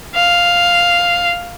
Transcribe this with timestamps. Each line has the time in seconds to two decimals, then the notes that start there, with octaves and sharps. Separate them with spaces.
0.15 F5